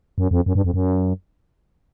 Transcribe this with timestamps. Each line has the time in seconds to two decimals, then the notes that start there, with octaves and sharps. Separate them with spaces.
0.18 F#2
0.31 F2
0.46 F#2
0.55 G2
0.64 F2
0.74 F#2